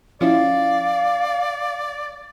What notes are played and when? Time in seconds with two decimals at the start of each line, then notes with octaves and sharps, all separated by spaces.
0.21 F3 C#4 E4 D5 F5